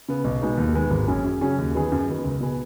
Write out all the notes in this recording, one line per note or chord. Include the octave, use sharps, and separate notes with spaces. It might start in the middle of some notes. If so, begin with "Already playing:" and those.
C#3 B3
B1
B2 G#3 B3 D#4
D#2
D#3 G#3 B3
G#1
F#2 F#3 C#4 G#4
F#2
C#3 F#3 C#4 G#4
D#2
D#3 F#3 B3 G#4
F#2
D#3 B3
C#2
B2 B3 G#4